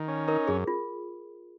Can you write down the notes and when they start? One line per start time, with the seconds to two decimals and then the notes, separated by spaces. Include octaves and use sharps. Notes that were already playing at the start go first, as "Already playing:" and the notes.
Already playing: D#3
0.08 C#4
0.28 D#4 A#4
0.48 F#2 G#4
0.67 F4